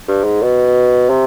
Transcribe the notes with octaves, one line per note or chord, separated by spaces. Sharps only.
G2
G#2
B2
C3